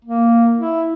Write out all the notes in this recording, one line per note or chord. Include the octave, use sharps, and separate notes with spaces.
A#3
E4